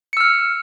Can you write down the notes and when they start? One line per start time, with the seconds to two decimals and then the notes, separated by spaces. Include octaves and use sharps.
0.13 C#7
0.17 E6
0.21 F6